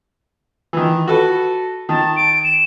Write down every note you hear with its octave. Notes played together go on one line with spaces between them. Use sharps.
D#3 E3
F#4 A4 B4
D#3 A5
D7
E7